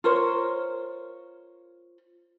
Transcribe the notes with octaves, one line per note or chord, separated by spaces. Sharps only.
F4 A#4 C5 C#5